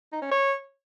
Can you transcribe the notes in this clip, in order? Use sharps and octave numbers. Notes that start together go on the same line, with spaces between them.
D#4
C#4
C#5